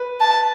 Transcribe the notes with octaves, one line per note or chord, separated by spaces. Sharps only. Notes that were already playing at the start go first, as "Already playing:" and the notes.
Already playing: B4
A5